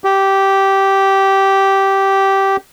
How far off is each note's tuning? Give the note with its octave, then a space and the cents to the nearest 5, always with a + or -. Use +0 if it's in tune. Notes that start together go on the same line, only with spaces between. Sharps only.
G4 -10